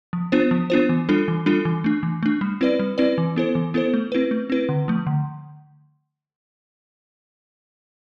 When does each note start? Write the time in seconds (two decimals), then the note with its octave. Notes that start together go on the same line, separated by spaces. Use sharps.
0.13 F3
0.32 B3 D4 F4 C5
0.51 F3
0.70 B3 D4 F4 C5
0.89 E3
1.09 G3 D4 F4 A4
1.28 E3
1.46 G3 D4 F4 A4
1.65 E3
1.84 A3 D4
2.03 E3
2.23 A3 D4
2.41 G3
2.61 C4 E4 B4 D5
2.79 G3
2.98 C4 E4 B4 D5
3.18 E3
3.36 B3 E4 A4 C5
3.55 E3
3.74 B3 E4 A4 C5
3.94 A3
4.12 C4 E4 B4
4.31 A3
4.50 C4 E4 B4
4.69 D3
4.88 F3 A3
5.07 D3